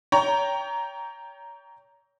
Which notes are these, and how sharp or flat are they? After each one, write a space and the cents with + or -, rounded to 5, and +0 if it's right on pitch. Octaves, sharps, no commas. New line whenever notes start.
C#5 +35 G5 +0 A#5 +0